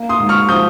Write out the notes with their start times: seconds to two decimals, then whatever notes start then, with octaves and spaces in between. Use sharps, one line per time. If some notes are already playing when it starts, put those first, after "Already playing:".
Already playing: A#3
0.09 C6 D#6
0.19 G#2
0.29 C#6 F6
0.49 F3 D#6 G6